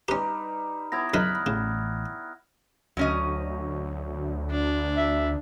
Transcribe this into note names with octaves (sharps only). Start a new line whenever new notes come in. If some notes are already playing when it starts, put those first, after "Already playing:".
G3 C#4 D#4 G4 B4 A#5
B3 E4 C#5 D#6 G#6 A#6
F#2 C#3 D#4 B5 F6 F#6
A1 C#3
D2 F#3 C#4 D#5
D4
E5